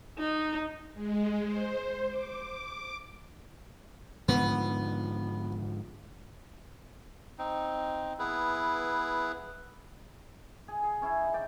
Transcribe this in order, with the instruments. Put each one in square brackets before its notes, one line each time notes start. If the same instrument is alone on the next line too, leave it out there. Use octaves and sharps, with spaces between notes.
[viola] D#4
[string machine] G#3
C5
D6
[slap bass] G#2 D3 F3 [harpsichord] B3
[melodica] C4 D#4
B3 E4 G#4 B4
[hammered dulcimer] G#4
G#4
C#4 E4 G#4
D#4
D5 G5